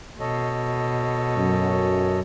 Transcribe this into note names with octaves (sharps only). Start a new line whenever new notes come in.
B2 A4 C#5 D#5
F#2